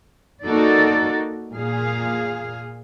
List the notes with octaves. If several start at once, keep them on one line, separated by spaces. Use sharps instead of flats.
A#3 D#4 F#4 A4 D5
A#2 G#4 F5